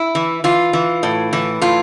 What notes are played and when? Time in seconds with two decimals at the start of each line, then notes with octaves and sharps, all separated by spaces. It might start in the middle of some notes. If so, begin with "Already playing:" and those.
Already playing: E4
0.15 E3
0.44 E3 F4
0.73 E3
1.03 A2
1.33 E3
1.61 A2 F4